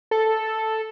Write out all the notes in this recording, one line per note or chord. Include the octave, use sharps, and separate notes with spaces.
A4